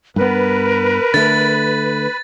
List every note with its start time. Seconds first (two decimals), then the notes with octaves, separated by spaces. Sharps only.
0.16 G2 B3 A#4 B4
1.14 D3 A3 A6